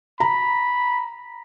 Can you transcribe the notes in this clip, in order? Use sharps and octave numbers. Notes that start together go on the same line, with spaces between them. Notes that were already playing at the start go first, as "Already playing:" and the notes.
A#5 B5